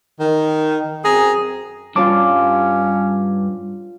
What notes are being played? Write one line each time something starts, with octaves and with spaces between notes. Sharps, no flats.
D#3
F#2 C4 G#4 A#5
G2 C#4 F4 C#5 A5 D6